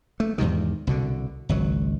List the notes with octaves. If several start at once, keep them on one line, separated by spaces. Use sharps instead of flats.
A3
E2 G#2 C3 D#3
C2 B2 D3
G#1 C#2 F#3